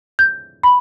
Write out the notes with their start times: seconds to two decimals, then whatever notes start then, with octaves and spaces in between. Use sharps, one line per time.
0.19 G6
0.63 B5